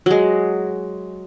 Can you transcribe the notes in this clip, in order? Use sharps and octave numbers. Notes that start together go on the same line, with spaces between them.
F#3 G#3